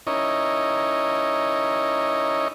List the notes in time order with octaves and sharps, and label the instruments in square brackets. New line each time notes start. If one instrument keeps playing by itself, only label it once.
[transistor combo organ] C#4 D#4 E4 A#4 C#5 D#5